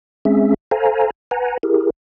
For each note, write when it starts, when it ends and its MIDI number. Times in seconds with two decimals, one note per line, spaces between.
0.25 0.54 56
0.25 0.54 60
0.25 0.54 61
0.25 0.54 68
0.25 0.54 76
0.71 1.10 69
0.71 1.10 72
0.71 1.10 77
0.71 1.10 80
0.71 1.10 82
1.31 1.58 71
1.31 1.58 78
1.31 1.58 80
1.31 1.58 82
1.63 1.90 64
1.63 1.90 67
1.63 1.90 68
1.63 1.90 70